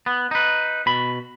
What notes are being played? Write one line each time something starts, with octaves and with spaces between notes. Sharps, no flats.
B3
D#4 B4
B2 B5